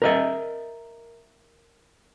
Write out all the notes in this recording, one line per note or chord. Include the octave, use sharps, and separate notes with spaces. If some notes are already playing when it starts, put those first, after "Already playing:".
A#4 D#5 E5